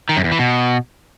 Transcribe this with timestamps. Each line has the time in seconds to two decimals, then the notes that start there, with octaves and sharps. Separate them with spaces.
0.09 D#3
0.17 F#2
0.24 E2
0.32 E3
0.39 B2